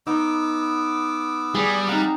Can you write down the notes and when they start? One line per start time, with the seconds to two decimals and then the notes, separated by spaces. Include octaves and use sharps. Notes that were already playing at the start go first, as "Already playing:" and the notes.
0.07 B3 D#4 D6 E6
1.55 G3 G#4 D5
1.88 C4 D#4 F5 F#5 A#5